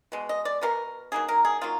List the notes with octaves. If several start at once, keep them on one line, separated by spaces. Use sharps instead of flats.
B2 G#3
D#5
D5
B2 G#3 B3 A#4
F#3 A#3 D#4 G#4
A#4
G#4
F#3 A#3 D#4 F4